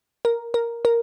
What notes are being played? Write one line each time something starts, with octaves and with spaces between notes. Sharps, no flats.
A#4
A#4
A#4